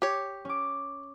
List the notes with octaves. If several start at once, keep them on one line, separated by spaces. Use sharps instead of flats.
G4 C#5
C#4 D6